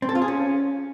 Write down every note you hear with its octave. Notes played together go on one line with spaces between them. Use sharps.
C4
A4
F4
G#4
C#4